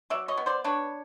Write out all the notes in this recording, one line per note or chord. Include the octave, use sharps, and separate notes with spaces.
F#3 D5 E5
C#5 D#5
B3
C5 D5
D4 B4 C#5